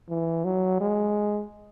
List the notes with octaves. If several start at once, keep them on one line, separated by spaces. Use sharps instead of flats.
E3
F#3
G#3